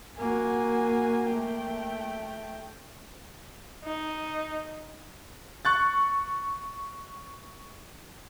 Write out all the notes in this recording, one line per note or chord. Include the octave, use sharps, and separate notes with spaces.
A#3 F#4 G#5
A3 G5
D#4
C#6 F#6 A6